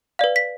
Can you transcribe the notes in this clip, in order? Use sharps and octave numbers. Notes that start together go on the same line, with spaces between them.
B4 D5 F5
B6